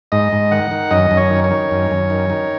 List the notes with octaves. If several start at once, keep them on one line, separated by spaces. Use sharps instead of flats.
G#2 D#5
G#2
D#3 F#5
D#3
F#2 D#5
F#2
C#5
D#3
C#5
D#3
F#2
F#2
D#3
D#3